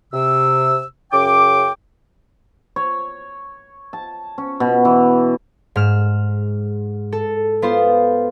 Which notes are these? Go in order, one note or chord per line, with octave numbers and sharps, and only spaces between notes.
C3 E6
F#2 C#3 G5 D6
C#5
A5
C#4
B2
E3
G#2 F6 E7
A4
B3 F4 C5